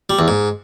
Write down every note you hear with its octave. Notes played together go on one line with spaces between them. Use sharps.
G3
E2
G#2